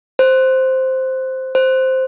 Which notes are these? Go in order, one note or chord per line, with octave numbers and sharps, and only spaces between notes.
C5
C5